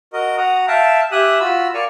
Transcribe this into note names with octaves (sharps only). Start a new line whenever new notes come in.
F#4 A#4 D#5
F#4 F#5 A#5 D#6
E5 F5 G5 A5
G4 E5 G#5 D#6 F#6
F4 F#4 B5 E6
A#4 D5 F5 G#5 C#6 F6